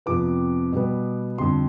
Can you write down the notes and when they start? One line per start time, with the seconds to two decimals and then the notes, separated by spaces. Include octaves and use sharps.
0.06 F2 C3 F3 B3 D6
0.72 B2 G3 B3
1.38 F2 D3 G3 C6